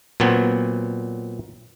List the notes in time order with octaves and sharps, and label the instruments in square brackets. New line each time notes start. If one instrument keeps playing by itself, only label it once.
[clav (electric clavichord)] A#2 F#3 B3 C4